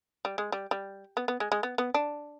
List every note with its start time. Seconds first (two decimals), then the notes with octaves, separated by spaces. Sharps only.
0.25 G3
0.38 G#3
0.52 G3
0.71 G3
1.17 B3
1.28 B3
1.40 G#3
1.52 G#3
1.63 B3
1.78 B3
1.94 D4